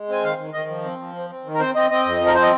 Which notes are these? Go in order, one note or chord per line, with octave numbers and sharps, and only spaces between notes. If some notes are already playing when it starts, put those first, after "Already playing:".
Already playing: G#3
C4 G#5
D#3 F5
D#3
D#3 D#5
F3
C4
F3
C4
C4
D#3
A#4
C4 C5
C4 D#5
C4 D#5
F2
F3
A#4
C4 C5
D#5